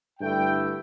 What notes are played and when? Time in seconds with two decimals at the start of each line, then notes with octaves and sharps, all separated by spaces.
0.20 G2 D3 A3 E4 G5